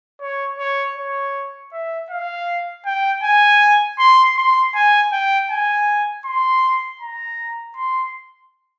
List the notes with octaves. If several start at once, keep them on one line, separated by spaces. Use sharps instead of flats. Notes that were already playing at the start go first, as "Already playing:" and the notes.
C#5
C#5
C#5
E5
F5
G5
G#5
C6
C6
G#5
G5
G#5
C6
A#5
C6